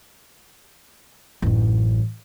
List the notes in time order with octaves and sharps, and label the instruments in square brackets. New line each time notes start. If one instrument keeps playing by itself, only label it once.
[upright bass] A1 F#2